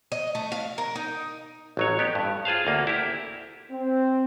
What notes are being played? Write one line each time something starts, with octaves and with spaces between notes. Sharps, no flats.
D#5
A3
F5
A#4
D#4
A1 F#3 C#5
B3 G4
G2
F4 G#4 C5 F5
D2 A#3
E4 G4
C4